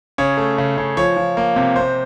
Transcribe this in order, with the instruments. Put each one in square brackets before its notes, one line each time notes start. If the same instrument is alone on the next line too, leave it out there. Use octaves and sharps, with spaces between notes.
[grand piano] C#3 C#5
A3
C#3
C#3
F3 C#5
F3
A#3
C3
C3 C5